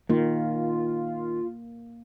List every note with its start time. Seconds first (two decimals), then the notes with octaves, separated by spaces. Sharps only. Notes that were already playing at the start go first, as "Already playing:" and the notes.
0.09 D#3 A#3 F4